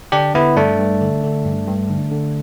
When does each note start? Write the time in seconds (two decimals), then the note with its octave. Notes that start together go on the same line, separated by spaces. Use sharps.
0.12 D3 D4 G4
0.34 D3 B3 E4
0.56 G2 A3 D4
0.79 G2
1.01 D3
1.24 D3
1.45 G2
1.68 G2
1.90 D3
2.12 D3